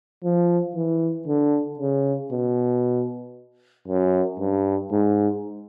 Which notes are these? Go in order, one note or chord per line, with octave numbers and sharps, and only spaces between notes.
F3
E3
D3
C#3
B2
F#2
G2
G#2